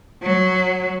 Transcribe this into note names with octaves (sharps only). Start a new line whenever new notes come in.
F#3